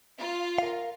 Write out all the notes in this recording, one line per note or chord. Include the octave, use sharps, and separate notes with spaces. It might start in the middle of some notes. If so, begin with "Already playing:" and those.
F4
A#4 F5